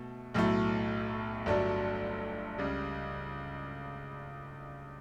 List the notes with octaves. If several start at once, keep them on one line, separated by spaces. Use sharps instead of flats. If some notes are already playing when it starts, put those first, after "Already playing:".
Already playing: B2 A3
B1 A2 F#3 A3
G1 G2 F#3 A3 D4
C#2 C#3 G3